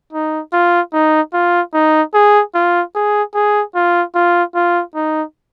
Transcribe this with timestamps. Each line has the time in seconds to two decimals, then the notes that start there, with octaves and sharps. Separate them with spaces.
0.13 D#4
0.53 F4
0.93 D#4
1.33 F4
1.74 D#4
2.14 G#4
2.54 F4
2.95 G#4
3.34 G#4
3.75 F4
4.15 F4
4.55 F4
4.95 D#4